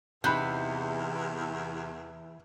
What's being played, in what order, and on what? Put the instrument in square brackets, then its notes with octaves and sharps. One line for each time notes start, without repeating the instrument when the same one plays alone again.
[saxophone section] E2 [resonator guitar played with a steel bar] C3 [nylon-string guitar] E3 D#4 [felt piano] B5 F#6 G6